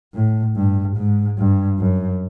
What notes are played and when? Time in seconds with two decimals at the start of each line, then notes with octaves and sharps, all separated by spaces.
0.14 A2
0.56 G2
0.97 G#2
1.38 G2
1.79 F#2